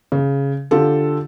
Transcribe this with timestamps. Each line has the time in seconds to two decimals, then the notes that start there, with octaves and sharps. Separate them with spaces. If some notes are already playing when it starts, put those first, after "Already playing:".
0.12 C#3
0.71 D3 F4 G4 A4